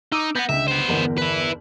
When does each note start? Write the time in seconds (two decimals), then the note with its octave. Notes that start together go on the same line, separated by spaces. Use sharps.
0.12 D#4 D6 E6
0.35 B3 F#5 G6 A#6 B6
0.49 C#2 D3 E5
0.68 B3 C5
0.88 G1 E2 A#4
1.18 E4 B4